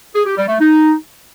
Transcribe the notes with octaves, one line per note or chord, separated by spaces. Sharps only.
G#4
G4
G3
A3
D#4